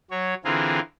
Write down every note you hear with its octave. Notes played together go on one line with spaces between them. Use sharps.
F#3 C#5
D3 E3 C4 F4 G#4 A#4